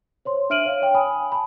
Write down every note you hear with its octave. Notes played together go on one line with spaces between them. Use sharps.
C5 C#5 C6
D4 E5 F6 D7 D#7 F#7
C#5 F5
C#5 G5
G#5 B5 D#6
A5 B5